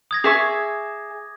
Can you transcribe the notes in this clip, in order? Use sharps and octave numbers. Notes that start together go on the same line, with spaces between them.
D#6 G#6 A#6
G#4 E5 C#6 D6